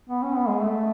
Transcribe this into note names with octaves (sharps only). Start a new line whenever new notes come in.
B3
C#4
B3
G#3
A3